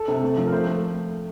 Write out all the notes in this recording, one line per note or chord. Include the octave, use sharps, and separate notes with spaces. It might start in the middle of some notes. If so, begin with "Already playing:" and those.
Already playing: A4
C3
A3
F3
A#4
A3 C5
A3